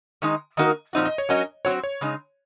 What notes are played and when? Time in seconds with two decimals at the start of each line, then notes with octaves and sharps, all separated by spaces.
0.22 D#3 G#3 D#4
0.57 D#3 A#3 D#4 F#4 A#4 D#5
0.93 A#2 F3 C4 D#4 F#4
1.05 D#5
1.18 C#5
1.29 F#3 C#4 F#4 A#4 D#5
1.65 F#3 C4 F#4 C#5
1.84 C#5
2.01 C#3 G#3 D#4